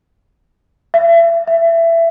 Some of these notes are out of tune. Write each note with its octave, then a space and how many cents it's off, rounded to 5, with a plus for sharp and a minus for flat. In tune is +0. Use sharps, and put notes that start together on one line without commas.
E5 +35
E5 +20